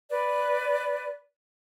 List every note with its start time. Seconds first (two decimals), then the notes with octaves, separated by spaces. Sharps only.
0.10 B4 D5